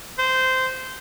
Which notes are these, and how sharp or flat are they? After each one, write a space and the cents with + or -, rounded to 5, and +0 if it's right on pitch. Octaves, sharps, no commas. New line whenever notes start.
C5 -15